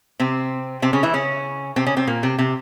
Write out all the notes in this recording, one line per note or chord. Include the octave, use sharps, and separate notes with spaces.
C3 C4
C3 C4
C#3 C#4
E3 E4
C#3 C#4
C3 C4
C#3 C#4
C3 C4
A#2 A#3
C3 C4
C3 C4